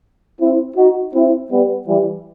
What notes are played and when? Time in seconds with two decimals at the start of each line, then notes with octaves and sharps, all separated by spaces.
0.40 C4 E4
0.77 D#4 F#4
1.14 C4 E4
1.51 G3 B3
1.87 E3 G3